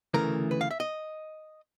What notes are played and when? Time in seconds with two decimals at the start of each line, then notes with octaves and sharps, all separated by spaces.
0.14 D2 C#3 E3 A3 A#4
0.51 B4
0.61 F5
0.71 E5
0.80 D#5